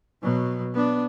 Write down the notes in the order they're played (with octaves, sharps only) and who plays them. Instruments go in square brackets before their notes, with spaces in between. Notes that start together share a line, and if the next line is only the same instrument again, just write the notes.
[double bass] B2 F#3
B3 D4